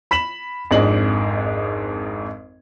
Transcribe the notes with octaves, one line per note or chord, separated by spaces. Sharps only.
B5 B6 E7 F#7
G#1 F2 G#2 D4 D#5 F#7